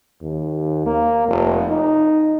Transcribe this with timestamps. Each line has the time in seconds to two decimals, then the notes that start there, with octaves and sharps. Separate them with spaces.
0.21 D#2
0.86 A#3
1.28 F1
1.68 D#4